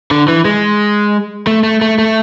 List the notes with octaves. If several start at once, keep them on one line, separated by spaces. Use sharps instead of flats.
D3
E3
G#3
A3
A3
A3
A3